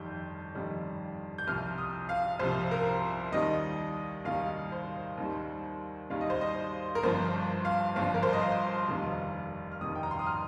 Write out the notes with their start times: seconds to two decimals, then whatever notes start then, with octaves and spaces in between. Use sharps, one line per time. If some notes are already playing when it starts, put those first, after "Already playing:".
Already playing: G1 F2 D#3 G3 G6
0.55 G1 F2 D#3 G3
1.38 G6
1.47 C2 C3 F3 F6
1.78 D#6
2.09 F5
2.39 C2 C3 F3 C5
2.71 A#4
3.32 D#2 D#3 G3 D#5
4.25 D#2 D#3 G3 F5
4.72 C5
5.17 D#2 D#3 G3
6.10 D#2 D#3 G3 F5
6.21 D#5
6.30 C5
6.41 D#5
6.95 A#4
7.03 G1 G2 F3 C5
7.65 F5
7.96 G1 G2 F3 F5
8.14 A#4
8.23 C5
8.33 D#5
8.41 F5
8.88 F1 D#2 D#3 G3
9.72 F6
9.81 F1 D#2 D#3 G3 D#6
9.95 G5
10.03 A#5
10.11 C6
10.19 D#6
10.27 F6